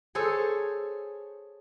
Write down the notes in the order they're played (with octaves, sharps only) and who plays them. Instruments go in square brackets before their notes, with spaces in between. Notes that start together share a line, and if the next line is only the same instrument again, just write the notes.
[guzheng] G#4 A4 C5 C#5 G#5